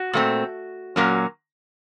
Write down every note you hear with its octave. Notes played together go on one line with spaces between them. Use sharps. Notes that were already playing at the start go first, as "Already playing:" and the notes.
Already playing: F#4
A#2 A3 C4
A#2 F#3 A#3 C#4